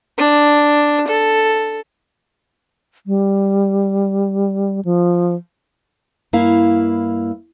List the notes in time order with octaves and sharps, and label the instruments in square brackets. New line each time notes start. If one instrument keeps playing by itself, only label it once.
[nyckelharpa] D4
A4
[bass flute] G3
F3
[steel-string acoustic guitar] G2 A#3 E4 F5